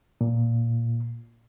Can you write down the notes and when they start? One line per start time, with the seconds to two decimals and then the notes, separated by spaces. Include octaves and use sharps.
0.21 A#2